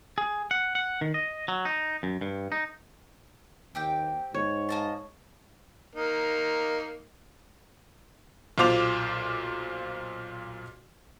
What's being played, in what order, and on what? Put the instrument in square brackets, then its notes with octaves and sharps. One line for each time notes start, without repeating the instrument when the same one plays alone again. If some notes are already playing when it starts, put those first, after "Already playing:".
[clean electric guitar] G#4
F#5
F#5
D#3
D#5
F#3
D#4
F#2
G2
D#4
[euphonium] D#2 [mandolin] C4 G4 G5
[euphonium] G#2 [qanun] C#5
[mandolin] A#3 D#5 A5
[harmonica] A#3 D#4
[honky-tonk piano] B1 A#2 F4 C5 D6 F7